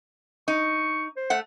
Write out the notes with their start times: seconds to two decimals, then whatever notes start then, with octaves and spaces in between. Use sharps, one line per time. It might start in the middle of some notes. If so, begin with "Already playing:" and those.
0.48 D#4 C#6
1.17 C5
1.30 A3 F#5